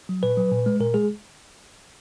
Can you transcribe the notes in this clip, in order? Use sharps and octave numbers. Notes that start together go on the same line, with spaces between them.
F#3
A#2 B4
F#3
A#2
G#3
A#2 A#4
G#3 G#4